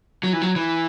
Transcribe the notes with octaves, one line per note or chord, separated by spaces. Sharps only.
F#3
E3
F#3
E3